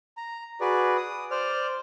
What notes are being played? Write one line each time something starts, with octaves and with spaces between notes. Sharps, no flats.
A#5
F#4 G#4 B4 D5
D#6
C5 D5 F6